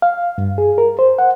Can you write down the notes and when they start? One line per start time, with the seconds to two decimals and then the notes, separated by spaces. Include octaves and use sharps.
0.02 F5
0.38 G2
0.58 G#4
0.78 A#4
0.99 C5
1.19 F#5